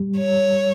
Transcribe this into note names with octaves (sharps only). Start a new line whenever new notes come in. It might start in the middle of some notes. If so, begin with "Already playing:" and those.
Already playing: G3
C#5